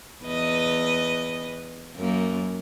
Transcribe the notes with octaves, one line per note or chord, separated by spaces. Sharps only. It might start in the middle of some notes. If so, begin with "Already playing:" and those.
E2 B4 D#5
F#2 A#3